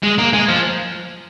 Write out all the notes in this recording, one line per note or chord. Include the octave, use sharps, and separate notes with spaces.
G#3
A#3
G#3
F3